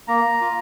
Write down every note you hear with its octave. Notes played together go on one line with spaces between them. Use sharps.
A#3 A#5
F4